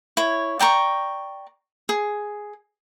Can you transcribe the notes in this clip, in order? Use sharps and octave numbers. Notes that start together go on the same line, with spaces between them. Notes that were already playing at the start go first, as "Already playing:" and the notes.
E4 C#5
D5 G5 A#5 C#6
G#4